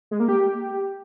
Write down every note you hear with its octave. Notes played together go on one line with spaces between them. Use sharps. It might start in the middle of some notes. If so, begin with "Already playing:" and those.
G#3
A#3
G4